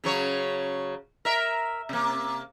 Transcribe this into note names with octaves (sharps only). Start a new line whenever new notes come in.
C#3 F#3 C#5
A#4 E5
C3 A#3